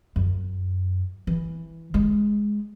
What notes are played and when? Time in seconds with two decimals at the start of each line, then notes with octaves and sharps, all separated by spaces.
0.16 F#2
1.27 E3
1.94 G#3